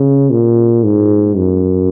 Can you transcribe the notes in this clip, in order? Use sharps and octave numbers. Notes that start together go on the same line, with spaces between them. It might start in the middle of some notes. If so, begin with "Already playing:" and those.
Already playing: C#3
A#2
G#2
F#2